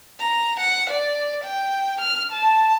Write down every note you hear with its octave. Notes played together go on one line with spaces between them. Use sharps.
A#5
F#5
D5
G5
F6
A5